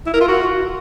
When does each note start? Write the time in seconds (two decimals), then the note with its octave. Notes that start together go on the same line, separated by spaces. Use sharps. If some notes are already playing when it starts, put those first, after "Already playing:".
0.06 E4
0.14 A#4
0.21 F4
0.28 F#4